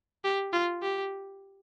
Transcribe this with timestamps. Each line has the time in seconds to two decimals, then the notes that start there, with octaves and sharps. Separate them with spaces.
0.24 G4
0.52 F4
0.82 G4